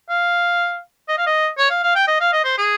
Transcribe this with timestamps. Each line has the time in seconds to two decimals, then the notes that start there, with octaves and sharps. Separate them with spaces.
0.09 F5
1.08 D#5
1.18 F5
1.26 D#5
1.58 C#5
1.70 F5
1.83 F5
1.95 G5
2.07 D#5
2.20 F5
2.33 D#5
2.45 C5
2.58 G#4